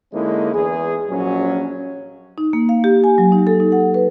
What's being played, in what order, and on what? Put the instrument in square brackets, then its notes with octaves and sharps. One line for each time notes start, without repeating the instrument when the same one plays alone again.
[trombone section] D3 G#3 A#3 C#4 D#4 E4
E2 G#4
A#1 F#3 C#4
[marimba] D#4
A#3
F5
G4
G#5
F#3
D#4
A4
D#4
F#5
B4